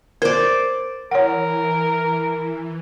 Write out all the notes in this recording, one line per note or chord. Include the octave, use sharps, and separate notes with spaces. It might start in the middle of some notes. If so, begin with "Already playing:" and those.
A#4 C5 D5
E3 A#4 C#5 F#5